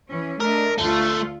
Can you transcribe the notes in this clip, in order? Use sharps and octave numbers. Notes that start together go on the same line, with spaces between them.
E3 C#4
A3 D4 A#4 D#5
D2 A3 F4